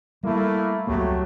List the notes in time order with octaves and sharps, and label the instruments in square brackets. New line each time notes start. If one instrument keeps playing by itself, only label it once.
[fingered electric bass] G3 [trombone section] A3 A#3 E4
[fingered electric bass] C#2 G3 A#3 [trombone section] F#3 A3 G4